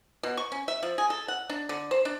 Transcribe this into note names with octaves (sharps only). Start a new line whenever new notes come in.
B2
C#6
C#4
E5
F3
G#4
A4
F#5
D4
D3
C5
D4